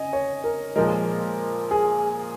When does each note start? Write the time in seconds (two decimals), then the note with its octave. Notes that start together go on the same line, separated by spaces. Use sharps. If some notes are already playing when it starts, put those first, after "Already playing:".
Already playing: C#3 D#5 G#5
0.13 C#5
0.44 A#4
0.76 A#2 F3 G#3 A#4
1.71 G#4